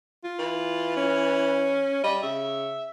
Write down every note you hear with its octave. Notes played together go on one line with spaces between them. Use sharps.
F4
E3
C#4
G3 D#5
C#3 E5